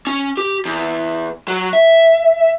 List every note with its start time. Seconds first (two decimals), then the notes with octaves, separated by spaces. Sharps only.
0.07 C#4
0.37 G4
0.65 E2
1.48 F#3
1.73 E5